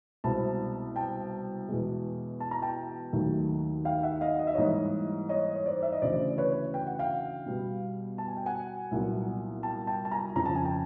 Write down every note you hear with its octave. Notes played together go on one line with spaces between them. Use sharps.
C2 B2 G#3 C4 A5 B5
G5 A5
E2 B2 G#3
A5
A#5
G5 A5
D#2 D#3 F#3 A3
F5 G5
E5 F#5
D#5 F5
D#5
E5
G#2 E3 G3 A#3 C#5 D#5
C#5 D#5
C#5
C5 D5
E5
D#5
D2 C#3 E3 A3 C5 D5
B4 C#5
G5
F#5
F5 G5
B2 G3 B3
A5
G#5
G5
F#5 G#5
C2 A#2 F#3 B3
G5 A5
G5 A5
A5
G#5 A#5
F2 C#3 F3 A#5
A5
G#5
G5 A5